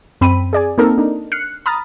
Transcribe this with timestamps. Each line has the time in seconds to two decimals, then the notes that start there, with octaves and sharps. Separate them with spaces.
0.21 F#2 C4 B5 D#7
0.53 G#4 D5 G#5
0.78 A#3 C4 D#4 A4 A#4
0.98 D4 D#4
1.32 F6 F#6 C7 C#7
1.66 A#5 B5 D#6 F6 A6